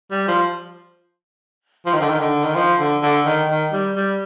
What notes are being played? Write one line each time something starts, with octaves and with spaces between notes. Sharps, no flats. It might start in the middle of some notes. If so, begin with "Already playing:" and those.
G3
F3
F3
D#3
D3
D#3
D3
D#3
F3
D3
D3
D#3
D#3
G3
G3